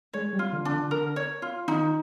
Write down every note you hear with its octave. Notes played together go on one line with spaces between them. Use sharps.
G#3 C#5
G3
F4
D3
D4
D3
D3 A#4
C#5
F4
D#3 D#4